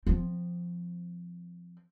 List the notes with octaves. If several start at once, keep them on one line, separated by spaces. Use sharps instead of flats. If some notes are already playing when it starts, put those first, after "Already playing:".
F3 C4